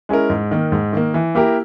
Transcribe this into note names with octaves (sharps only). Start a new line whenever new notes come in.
G#3 C#4 E4 A#4
G#2
D#3 A#3
G#2
D#3 A#3
E3
A#3 E4 G4 A#4